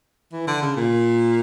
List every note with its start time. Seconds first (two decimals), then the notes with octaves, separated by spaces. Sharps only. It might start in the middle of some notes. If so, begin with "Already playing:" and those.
0.32 E3
0.47 D3
0.62 C#3
0.77 A#2